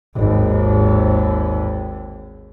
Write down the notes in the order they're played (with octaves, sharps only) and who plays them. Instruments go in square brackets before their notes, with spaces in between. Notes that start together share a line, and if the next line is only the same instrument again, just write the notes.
[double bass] G#1 D#2